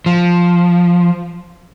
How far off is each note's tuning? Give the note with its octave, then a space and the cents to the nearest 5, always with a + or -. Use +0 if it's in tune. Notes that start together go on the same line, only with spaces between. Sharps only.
F3 +5